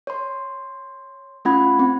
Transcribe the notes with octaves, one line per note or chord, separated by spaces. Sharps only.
C#5 C6
A3 C#4 F4 F#5 B5 G#6
C4